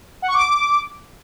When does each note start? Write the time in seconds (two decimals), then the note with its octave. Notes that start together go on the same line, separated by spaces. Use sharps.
0.22 F#5
0.28 C#6
0.34 D6